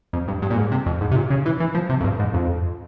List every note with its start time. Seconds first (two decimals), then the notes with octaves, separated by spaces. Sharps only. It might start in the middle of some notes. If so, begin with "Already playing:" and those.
0.13 F2
0.28 G2
0.42 G2
0.50 A#2
0.57 G#2
0.72 C3
0.86 F2
1.01 G#2
1.11 C3
1.16 A#2
1.30 C#3
1.46 E3
1.60 E3
1.75 F3
1.90 C3
2.01 F2
2.04 G2
2.20 G#2
2.34 F2